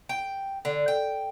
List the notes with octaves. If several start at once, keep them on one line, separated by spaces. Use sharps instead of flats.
G5
D3
G5